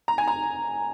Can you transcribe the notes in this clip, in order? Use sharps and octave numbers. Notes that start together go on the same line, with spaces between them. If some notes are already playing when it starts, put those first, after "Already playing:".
A#5
G#5
A#5